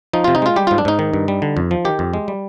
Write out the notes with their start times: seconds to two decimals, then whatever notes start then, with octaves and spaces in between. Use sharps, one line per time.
0.13 F3 D#4
0.24 C3 F4
0.35 D#4
0.42 G#3 F4
0.56 G3 G4
0.67 G#2 F4
0.78 D4
0.85 G#2 D#4
0.99 D#3
1.13 G2
1.28 G3
1.42 D3
1.57 F2
1.71 F3
1.85 D#3 G4
1.99 F2
2.14 G#3
2.28 G3